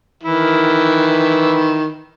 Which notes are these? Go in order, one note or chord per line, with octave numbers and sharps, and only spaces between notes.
D#3 E3 E4